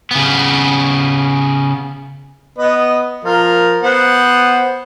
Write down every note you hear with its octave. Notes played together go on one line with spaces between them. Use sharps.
C#3 B3
B3 B4 D#5
F3 F4 A#4
B3 C5 F#5